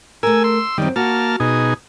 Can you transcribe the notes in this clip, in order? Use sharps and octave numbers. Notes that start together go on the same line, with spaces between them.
A3 G#4 A#4 G#5 E6
C6 E6
F#2 D#3 G3 C4
A#3 F#4 A5 F6
B2 D#4 G#4